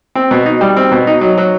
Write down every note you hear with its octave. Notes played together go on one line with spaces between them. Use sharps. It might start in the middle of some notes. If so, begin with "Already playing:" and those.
C4
B2
D#4
G3
C4
B2
D#4
F#3
F#3